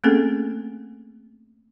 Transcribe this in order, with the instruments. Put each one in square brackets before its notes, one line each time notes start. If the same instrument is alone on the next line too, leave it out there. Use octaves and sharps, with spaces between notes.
[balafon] A3 A#3 C4 C#4 G#4 A4